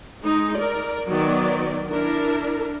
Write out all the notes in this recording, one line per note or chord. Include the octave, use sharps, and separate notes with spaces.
G#3 D#4
A#4 D5
D#3 F#3 B3 D5
D4 E4 A#4